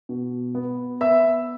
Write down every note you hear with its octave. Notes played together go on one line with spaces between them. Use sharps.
B2
B3
B3 E5 E6